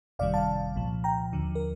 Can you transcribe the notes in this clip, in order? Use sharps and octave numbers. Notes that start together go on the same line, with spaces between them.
G1 F2 C3 D#3 G3 D5 F5
F5 A5
C2 A#2 F3
G5 A#5
D#2 D3 F3
A#4